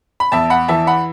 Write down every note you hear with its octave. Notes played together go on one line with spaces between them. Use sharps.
B5
E2 E5 A5
F#5 B5
E3 E5 A5
F#5 B5